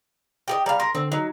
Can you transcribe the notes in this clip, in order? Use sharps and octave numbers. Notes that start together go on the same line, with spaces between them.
G4 G#4 D#5
G3 D5 F5 A#5
A#4 C6
D3 C4
F#3 D#4